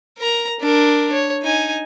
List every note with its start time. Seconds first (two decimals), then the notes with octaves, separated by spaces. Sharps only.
0.18 A#4 A#5
0.60 D4 A#4
1.12 C#5
1.42 D#4 G#5